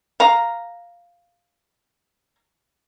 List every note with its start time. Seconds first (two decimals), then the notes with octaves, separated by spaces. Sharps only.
0.20 F5 A#5